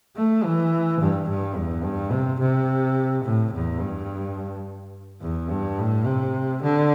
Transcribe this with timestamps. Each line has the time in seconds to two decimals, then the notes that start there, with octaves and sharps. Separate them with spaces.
0.16 A3
0.43 E3
1.00 G2
1.28 G2
1.56 E2
1.84 G2
2.12 C3
2.40 C3
3.24 A2
3.53 E2
3.80 G2
5.22 E2
5.50 G2
5.78 A2
6.05 C3
6.62 D3